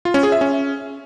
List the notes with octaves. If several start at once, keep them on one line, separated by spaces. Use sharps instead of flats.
F4
C#4
G#4
E5
C#4